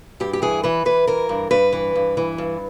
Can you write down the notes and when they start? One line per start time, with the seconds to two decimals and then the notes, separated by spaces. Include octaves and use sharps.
0.20 G2 G4
0.33 G4
0.42 E3 G#4
0.63 E3 B4
0.85 E3 B4
1.07 E3 A#4
1.29 G2
1.51 G2 B4
1.73 E3
1.95 G2
2.17 E3
2.38 G2